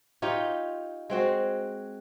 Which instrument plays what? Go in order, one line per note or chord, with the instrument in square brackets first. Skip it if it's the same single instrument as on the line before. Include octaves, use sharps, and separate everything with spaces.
[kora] D#4 F4 G4 C#5
G#3 C4 F#4